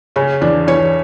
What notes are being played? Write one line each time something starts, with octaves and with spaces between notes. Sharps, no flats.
C#3 C#4
E2 D4
E2 C#5